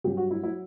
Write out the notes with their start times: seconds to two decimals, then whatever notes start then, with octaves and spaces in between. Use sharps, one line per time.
0.04 G2 F#3 G4
0.17 F#4
0.31 E4
0.43 F#3 E4